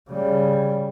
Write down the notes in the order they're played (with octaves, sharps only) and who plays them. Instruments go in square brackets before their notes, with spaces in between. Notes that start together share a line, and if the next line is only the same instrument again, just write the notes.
[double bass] C#3 G3